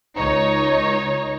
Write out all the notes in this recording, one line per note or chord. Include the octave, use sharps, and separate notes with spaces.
C#2 D#4 C#5